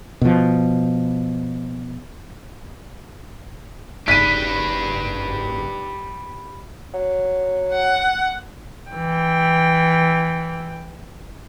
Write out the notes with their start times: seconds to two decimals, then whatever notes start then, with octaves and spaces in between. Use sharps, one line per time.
0.22 B2 F3
4.08 F#1 D#4 G4 B4 D5 F#6 B6 D#7
6.94 F#3
7.73 F#5
8.92 E3 G5